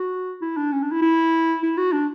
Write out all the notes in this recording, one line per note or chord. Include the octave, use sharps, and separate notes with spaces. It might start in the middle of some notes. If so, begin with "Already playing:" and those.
Already playing: F#4
E4
D4
C#4
D4
E4
E4
E4
F#4
D4